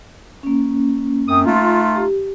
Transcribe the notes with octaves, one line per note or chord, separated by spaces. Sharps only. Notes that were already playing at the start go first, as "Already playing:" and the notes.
A#3 C#4
F#2 C4 D#6
A3 D#4 F4
G4